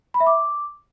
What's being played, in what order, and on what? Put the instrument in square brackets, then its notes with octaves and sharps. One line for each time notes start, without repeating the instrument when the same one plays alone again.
[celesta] B5
E5
D6